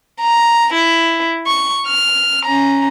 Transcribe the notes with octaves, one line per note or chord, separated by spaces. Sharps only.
A#5
E4
C#6
F6
C#4 A#5